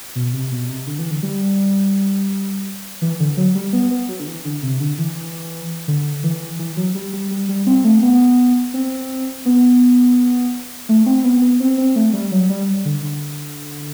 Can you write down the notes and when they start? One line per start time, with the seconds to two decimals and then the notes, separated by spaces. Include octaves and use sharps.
0.15 B2
0.33 C3
0.51 B2
0.69 C3
0.87 D3
0.99 E3
1.11 D3
1.23 G3
3.02 E3
3.20 D3
3.37 F#3
3.55 G3
3.73 B3
3.91 B3
4.09 F#3
4.20 D3
4.27 E3
4.45 D3
4.63 C3
4.80 D3
4.98 E3
5.88 D3
6.23 E3
6.59 E3
6.77 F#3
6.95 G3
7.13 G3
7.31 G3
7.49 G3
7.67 C4
7.84 A3
8.03 B3
8.74 C4
9.45 B3
10.89 A3
11.06 C4
11.24 B3
11.42 B3
11.60 C4
11.78 C4
11.96 A3
12.13 G3
12.32 F#3
12.49 G3
12.85 D3
13.03 D3